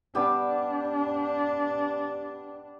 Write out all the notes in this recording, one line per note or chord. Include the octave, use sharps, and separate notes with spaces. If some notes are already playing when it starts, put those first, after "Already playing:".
G3 B3 D4 G4